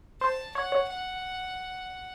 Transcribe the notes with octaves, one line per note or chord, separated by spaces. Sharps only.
C5 A5
C#5 F#5
C#5
F#5